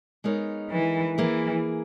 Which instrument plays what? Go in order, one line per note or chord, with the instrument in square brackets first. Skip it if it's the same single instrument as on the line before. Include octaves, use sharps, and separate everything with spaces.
[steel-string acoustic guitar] G#3 B3 D#4 A#4 C#5
[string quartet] E3
[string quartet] E3 [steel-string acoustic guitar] A#3 E4 G#4